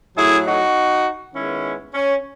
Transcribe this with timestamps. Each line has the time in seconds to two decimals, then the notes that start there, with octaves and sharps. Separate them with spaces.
0.17 A2 F#3 A3 E4 G#4
0.46 D#4 F#4
1.34 D#3 G#3 B3 C#4 E4
1.94 C#4